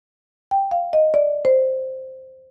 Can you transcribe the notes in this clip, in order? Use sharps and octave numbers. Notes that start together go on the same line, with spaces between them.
G5
F5
D#5
D5
C5